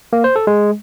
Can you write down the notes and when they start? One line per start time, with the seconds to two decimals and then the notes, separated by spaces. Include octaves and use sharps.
0.13 A#3
0.24 C5
0.36 A4
0.47 G#3